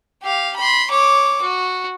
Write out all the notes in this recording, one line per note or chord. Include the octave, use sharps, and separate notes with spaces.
G4 F5
B5 C6
C#5 D6
F#4